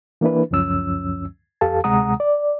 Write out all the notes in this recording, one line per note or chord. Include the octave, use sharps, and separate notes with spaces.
E3 A#3 D4 E4 B4
C#2 F#2 F3 C#4 E6
F2 G4 A4 F5 A5
D2 C3 G#3 F#5 A#5 D#6
D5